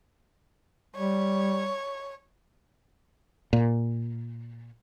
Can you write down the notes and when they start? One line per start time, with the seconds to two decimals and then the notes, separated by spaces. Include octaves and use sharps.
0.96 G3 C#5
3.53 A#2